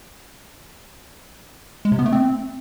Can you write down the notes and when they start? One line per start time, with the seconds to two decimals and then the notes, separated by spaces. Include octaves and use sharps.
1.85 G#3
1.92 C3
1.99 B3
2.06 A3
2.12 C4